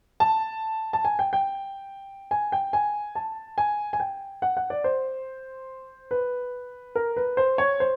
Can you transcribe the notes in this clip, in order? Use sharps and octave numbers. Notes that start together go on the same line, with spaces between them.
A5
A5
G#5
G5
G5
G#5
G5
G#5
A5
G#5
G#5
G5
F#5
F#5
D5
C5
B4
A#4
B4
C5
C#5
C5